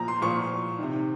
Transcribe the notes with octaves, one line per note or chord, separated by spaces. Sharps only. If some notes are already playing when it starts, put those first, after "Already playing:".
Already playing: A#2 F3 A#5
C6
A#2 F3 C#6
C3 D#3